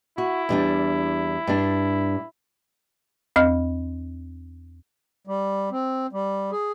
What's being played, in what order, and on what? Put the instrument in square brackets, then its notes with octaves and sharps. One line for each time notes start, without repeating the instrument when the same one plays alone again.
[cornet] E4 [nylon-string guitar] F#4
[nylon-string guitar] E2 G3 D4
G2 D4
[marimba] E2 C4 D#5 F6
[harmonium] G3
C4
G3
G#4